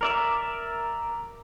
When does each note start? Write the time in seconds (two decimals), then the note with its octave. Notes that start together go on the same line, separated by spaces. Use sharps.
0.01 A#4 D5 E5